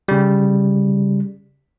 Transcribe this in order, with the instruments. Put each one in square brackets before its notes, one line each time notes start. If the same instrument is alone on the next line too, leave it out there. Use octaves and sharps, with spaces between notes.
[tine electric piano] C#3 G3